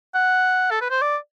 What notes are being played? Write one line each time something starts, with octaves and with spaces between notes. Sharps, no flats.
F#5
A4
B4
C5
D5